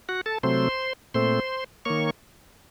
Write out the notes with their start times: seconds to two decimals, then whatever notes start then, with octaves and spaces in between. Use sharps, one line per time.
0.09 F#4 F#5
0.26 A4 A5
0.43 C3 F#3 A3 C4 C5 C6
1.14 A#2 A3 C4 C5 C6
1.85 D#3 A#3 C#5 C#6